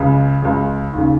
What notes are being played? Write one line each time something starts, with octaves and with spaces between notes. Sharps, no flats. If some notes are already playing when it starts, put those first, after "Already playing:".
Already playing: C#2 C#3
C#2 C#3
D#2 C#3